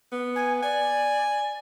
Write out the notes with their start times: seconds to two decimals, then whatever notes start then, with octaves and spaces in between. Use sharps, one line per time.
0.12 B3
0.36 G#5
0.63 D5 G#5